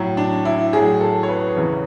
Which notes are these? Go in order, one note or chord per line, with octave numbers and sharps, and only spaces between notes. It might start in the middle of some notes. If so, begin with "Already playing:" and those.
Already playing: A2 F#3
D4
E4
A2 F#3 G#4
A4
C#5
B4
E2 C#3 E3